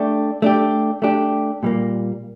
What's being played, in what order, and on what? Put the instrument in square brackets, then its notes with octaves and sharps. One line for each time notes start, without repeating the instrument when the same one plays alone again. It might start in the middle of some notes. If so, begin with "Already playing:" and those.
Already playing: [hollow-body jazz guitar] A3 D4 G4
A3 D4 G4
A3 D4 G4
A#2 G3 A#3